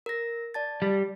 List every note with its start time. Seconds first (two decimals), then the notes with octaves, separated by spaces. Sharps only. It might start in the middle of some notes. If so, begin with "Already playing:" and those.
0.06 A#4 A#6
0.54 D5 A5 A6
0.82 G3